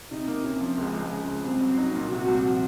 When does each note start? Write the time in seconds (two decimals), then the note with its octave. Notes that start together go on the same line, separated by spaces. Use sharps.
0.11 C3 D#4
0.27 A#3
0.44 C3 C#4
0.61 F3
0.78 C#2 G#3
0.94 C#2
1.12 C#3
1.28 C#2
1.44 C2 C4
1.61 F#3
1.78 F#3 D#4
1.95 A#2
2.11 C3 F#4
2.28 C2
2.45 F3